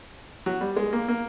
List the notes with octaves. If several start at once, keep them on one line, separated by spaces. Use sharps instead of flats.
F#3
G3
G#3
A#3
A#3